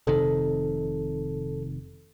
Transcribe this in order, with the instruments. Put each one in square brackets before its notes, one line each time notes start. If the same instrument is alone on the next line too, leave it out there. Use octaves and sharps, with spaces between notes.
[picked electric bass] F1 C3 D#3 [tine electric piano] A4